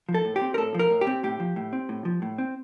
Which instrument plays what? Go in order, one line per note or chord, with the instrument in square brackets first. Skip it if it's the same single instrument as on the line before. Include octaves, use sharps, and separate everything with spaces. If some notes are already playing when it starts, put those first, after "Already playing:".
[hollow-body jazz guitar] F3
A4
A2
G4
C4
A#4
A2 A4
F3 A#4
A2
G4
C4
A2 G4
F3
A2
C4
A2
F3
A2
C4